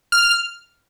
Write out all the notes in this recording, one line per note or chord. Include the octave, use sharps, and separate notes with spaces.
F6